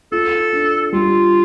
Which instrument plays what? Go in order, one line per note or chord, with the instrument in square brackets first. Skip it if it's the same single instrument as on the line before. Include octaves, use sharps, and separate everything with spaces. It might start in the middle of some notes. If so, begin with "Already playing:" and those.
[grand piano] F4 [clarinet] A4
[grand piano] D4
[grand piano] G3 [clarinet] F4